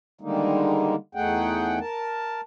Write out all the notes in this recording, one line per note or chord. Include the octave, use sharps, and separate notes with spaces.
D3 D#3 G3 G#3 A#3 D#4
E2 A3 D#4 G#4 F#5 G5
A#4 A5